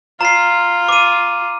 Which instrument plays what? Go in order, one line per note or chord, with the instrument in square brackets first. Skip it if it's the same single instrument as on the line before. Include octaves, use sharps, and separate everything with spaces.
[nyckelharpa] F4 [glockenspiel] A#5 C7
[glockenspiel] D6 D#7